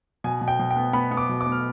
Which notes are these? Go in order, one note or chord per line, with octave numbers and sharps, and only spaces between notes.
B2 G#5
B2
G5
B2
G5
B3
B3 B5
B3
D6
B2
D6
B3
F6